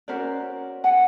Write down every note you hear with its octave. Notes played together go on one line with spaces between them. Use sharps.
C#4 F#4 A#4 C5 D5
F#5 G#5